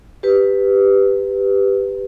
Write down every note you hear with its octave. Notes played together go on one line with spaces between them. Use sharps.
G4 B4